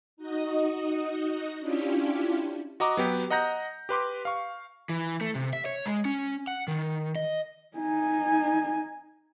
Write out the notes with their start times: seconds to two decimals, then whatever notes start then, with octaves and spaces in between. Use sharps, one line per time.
0.17 D#4 F#4 D#5 D#6
1.60 C#4 D4 E4 F4 G4
2.80 F#4 D#5 A#5 D6
2.97 F#3 B3 G4
3.30 D#5 F#5 A#5 G6 A#6
3.89 G4 B4 C6 D6
4.25 F5 C#6
4.89 E3
5.21 A3
5.35 C3
5.53 E5
5.66 C#5
5.86 G#3
6.05 C#4
6.48 F#5
6.68 D#3
7.16 D#5
7.77 D#4 G#5